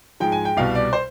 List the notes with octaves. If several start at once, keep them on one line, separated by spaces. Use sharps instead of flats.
G#2 F3 G#3 G5
G#5
G5
C2 B2 G3 F5
D5
C5